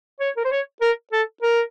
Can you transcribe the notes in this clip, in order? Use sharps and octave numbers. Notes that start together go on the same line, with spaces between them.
C#5
A#4
C5
C#5
A#4
A4
A#4